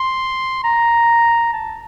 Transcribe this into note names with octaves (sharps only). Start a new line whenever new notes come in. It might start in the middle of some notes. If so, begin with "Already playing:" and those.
Already playing: C6
A#5
A5